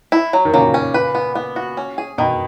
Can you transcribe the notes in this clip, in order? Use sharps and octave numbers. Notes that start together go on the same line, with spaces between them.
E4
F#3
D#3
A#2 C#3 F#3
C#4
B4
B3
B3
F#4
C#4
G#4
B2 D#3